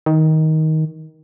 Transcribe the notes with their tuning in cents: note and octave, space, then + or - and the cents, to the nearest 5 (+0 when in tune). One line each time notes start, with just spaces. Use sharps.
D#3 +15